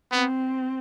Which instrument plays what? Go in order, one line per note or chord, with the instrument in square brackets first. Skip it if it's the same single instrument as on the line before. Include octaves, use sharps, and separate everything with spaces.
[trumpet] B3 [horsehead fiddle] C4